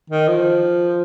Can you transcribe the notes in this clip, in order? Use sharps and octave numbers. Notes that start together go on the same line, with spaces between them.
D#3
F3